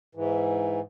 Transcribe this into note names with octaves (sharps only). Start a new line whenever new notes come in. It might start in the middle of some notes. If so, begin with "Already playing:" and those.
G#2 E3